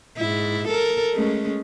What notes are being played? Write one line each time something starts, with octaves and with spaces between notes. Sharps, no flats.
G#2 E4
A4 A#4
G#3 A3 C#4